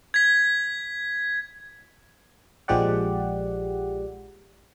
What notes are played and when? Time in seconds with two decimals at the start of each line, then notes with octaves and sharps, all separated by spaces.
0.14 G#6 B6
2.68 A#1 F3 G#3 G4 D5 F#5